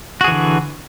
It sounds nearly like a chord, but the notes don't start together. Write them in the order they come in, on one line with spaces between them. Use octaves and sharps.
F#4 G#4 E3 D3